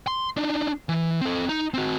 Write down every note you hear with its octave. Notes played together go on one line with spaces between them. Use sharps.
C6
D4 D#4
E3
C4 A4
D#4
C4 F#4